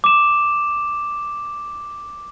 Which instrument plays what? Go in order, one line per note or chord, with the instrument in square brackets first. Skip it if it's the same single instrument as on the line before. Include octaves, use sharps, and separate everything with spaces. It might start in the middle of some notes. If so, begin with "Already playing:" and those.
[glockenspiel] D6 E7